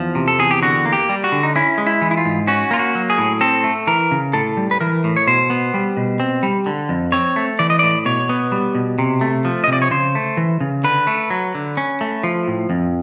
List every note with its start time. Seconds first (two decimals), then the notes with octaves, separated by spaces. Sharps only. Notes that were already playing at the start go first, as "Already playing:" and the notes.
Already playing: E2 F3
0.15 C3
0.28 A4
0.39 E2 G#4
0.51 G4
0.62 D3 F#4
0.85 A#3
0.93 G4
1.09 G3
1.24 F#4
1.32 D3
1.43 D#4
1.56 C#4 E4
1.78 G#3
1.87 E4
2.02 E3
2.11 E4
2.17 F4
2.25 G#2
2.47 C#4 F#4
2.71 A#3 F4
2.79 F#4
2.95 F#3
3.10 G#4
3.18 A2
3.41 C4 A4
3.64 A3
3.87 E3 A#4
4.11 C#3
4.33 A2 A4
4.57 G3
4.71 B4
4.81 E3 A#4
5.04 A2
5.16 C#5
5.27 B2 C5
5.50 B3
5.74 G3
5.97 B2
6.20 C4
6.43 G3
6.66 D3
6.89 F2
7.12 C4 C#5
7.36 A3
7.59 E3 D5
7.70 D#5
7.79 A2 D5
8.05 B2 C#5
8.29 B3
8.52 G3
8.75 B2
8.98 C3
9.21 A3
9.45 F3
9.64 D#5
9.68 C3
9.73 D5
9.82 C#5
9.91 C#3 C5
10.15 A3
10.37 E3
10.61 C#3
10.84 D3 B4
11.07 A3
11.30 F#3
11.55 D3
11.77 C#4
12.01 A3
12.24 F3
12.48 A2
12.70 F2